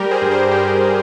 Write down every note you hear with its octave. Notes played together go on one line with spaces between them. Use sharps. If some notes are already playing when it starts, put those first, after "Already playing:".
Already playing: G3 G4 A#4
G#4 C5
G2
G#4 C5
G3 G4